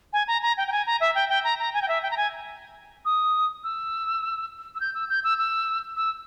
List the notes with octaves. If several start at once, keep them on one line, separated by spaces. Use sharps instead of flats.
G#5
A#5
A#5
G5
G5
G#5
A#5
E5
G5
G5
A#5
A#5
G#5
G5
E5
G5
A#5
G#5
D#6
E6
E6
G6
E6
G6
E6
E6
E6